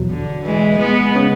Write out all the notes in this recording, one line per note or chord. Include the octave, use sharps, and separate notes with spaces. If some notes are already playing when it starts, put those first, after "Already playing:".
Already playing: E2 B2 F#3
D3
E3 G#3
G#3 B3
C#3